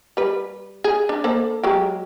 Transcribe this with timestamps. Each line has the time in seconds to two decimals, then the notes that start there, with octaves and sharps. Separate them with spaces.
0.17 G3 B4
0.84 G#4
1.09 D4
1.24 A#3 A4 C5
1.63 F#3 G#3 G4